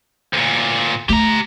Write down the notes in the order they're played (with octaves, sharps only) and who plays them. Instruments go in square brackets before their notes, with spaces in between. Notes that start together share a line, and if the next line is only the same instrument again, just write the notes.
[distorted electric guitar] D2 A#2
[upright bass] A3 [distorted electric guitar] G4 A#5